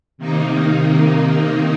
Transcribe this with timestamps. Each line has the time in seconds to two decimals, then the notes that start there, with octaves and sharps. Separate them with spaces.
0.18 C3 D#3 A#3 D#4